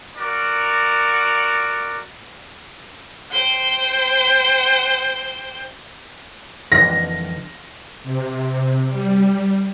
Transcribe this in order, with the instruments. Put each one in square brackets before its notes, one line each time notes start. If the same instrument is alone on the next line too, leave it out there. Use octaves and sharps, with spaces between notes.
[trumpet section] F#4 A#4 D5
[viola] C5 G5
[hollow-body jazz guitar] F2 D3 E3 [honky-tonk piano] A#6
[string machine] C3
G3